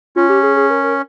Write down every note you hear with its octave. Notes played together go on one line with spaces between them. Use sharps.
C#4 F4
G4
G#4
G#4
A#4
A#4